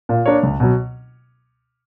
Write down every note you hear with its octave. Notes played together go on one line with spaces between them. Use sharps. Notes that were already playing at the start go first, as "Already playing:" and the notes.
A#2
A#3 D4 A#4 C#5
C#2
B2 F#3